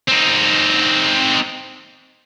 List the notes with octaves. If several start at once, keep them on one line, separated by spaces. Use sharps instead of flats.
C4 D#4